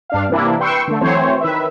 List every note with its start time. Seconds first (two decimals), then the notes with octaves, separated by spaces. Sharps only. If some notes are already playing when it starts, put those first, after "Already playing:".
0.10 G2 D4 F5
0.30 C3 E3 A#3 D4 E4
0.60 B4 G5 C6 C#6 E6
0.88 D3 A3
1.01 E3 F#3 A3 C4 C5 C#5
1.41 D#3 B4 E5